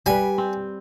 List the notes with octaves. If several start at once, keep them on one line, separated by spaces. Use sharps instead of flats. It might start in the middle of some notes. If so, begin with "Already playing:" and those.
G3 B4 G#5
C4